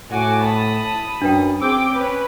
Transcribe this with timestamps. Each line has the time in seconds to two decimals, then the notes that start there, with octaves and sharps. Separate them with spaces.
0.11 A2 F#4 G#5 D6
0.41 A5 B5 D#6
1.22 F#2 D4 B4 G5
1.62 C4 G#4 G5 D6 E6
1.93 C#4 B4